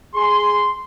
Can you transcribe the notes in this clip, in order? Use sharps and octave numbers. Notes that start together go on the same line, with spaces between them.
G#4 C6